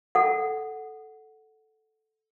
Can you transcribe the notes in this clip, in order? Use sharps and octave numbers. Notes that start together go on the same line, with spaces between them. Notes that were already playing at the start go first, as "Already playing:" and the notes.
A4 F#5